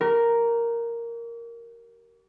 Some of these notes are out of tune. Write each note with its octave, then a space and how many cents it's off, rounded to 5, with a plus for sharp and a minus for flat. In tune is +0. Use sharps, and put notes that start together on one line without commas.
G4 -45 A#4 +0